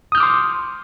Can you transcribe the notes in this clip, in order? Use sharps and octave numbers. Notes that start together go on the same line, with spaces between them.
C6 D6 D#6 F6 G6